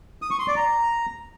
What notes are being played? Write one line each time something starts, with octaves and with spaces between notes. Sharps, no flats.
D#6
C#6
C6
D5
A#5